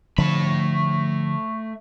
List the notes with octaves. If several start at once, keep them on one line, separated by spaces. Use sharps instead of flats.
D3 F3 A3 B5